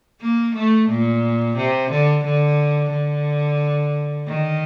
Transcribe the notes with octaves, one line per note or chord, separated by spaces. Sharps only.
A#3
A3
A#2
C3
D3
D3
D3
D#3